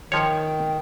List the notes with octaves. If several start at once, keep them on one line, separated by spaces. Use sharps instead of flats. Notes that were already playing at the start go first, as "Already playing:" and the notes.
D#3 F3 C#5 G5